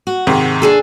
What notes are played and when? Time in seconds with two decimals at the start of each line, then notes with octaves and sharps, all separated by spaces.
0.07 F#4
0.27 G#2 C3 D#3
0.62 D4 G#4 A4